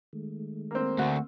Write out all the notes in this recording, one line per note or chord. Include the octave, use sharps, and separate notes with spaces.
D#3 G#3 A3
A#3 C4
D2 F#4